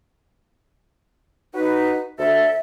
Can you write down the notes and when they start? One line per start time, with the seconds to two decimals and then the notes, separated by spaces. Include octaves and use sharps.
1.54 D#4 F#4 B4
2.19 D2 A4 E5